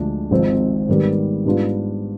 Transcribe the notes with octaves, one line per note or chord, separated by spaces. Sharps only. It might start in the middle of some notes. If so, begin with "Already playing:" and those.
Already playing: D2 D3 F3 G#3 D4
G#1 G#2 F3 C4 D#4
G#2 D#3 G3 B3
G#2 G3 B3 D4 F4